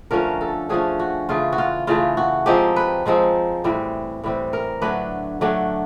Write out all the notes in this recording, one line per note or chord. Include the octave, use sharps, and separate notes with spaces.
D3 F3 A3 C#4 A#4
A4
D3 F3 A3 C#4 G#4
F#4
C#3 E3 A3 F4
F#4
F4
C#3 E3 A3 F4
F#4
F3 G#3 C4 D#4 G4
B4
F3 G#3 C4 D#4
A2 E3 G3 C4
A2 E3 G3 C4
A#4
D3 F#3 A3 D4 B4
D3 F#3 A3 D4